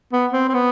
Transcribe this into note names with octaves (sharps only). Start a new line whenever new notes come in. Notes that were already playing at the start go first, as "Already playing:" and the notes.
B3
C4
C4
B3